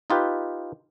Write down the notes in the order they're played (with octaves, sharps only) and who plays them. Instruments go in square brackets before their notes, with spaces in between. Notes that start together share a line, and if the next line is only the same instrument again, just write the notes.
[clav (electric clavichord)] D#4 F4 G4 B4